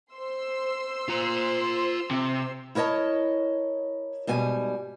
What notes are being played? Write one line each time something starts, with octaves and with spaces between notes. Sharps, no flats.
C5 C6 E6
F4 A#5
C3
E4 A#4 C#5 D#5 A5
G#2 B2 G3 G#5